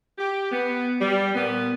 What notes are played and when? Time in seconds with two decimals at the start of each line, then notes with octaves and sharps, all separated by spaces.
0.18 G4
0.52 B3
1.01 G3
1.34 A#2 B3